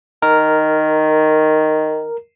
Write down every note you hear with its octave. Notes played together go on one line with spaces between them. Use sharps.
D#3 A#4